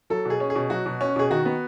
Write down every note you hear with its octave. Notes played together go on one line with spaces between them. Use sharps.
F#3 A4
B2 G#4
C#4
G#4
B2
F#3 F#4
B2
C#4
B2 G#4
D#3 F#4
B3